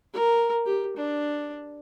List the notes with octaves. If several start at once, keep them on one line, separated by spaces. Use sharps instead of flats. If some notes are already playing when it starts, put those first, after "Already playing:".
A#4
G4
D4